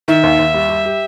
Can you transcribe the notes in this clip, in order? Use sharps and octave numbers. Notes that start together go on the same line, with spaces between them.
D#3 E5
D#2
D#2
G3
G4
G4